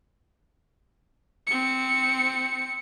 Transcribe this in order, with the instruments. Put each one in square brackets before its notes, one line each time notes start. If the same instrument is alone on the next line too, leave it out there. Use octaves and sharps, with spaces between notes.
[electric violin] C4 C#7